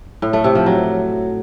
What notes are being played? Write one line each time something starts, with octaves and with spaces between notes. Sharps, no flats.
A2
A3
C3
F3
F#3